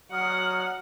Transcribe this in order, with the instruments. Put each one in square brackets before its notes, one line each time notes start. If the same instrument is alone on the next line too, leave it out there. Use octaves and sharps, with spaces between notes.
[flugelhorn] F#3 [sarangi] F#5 [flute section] D#6 F6